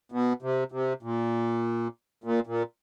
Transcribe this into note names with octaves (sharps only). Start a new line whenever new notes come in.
B2
C3
C3
A#2
A#2
A#2